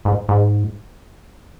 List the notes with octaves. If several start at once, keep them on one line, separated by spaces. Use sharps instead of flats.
G#2
G#2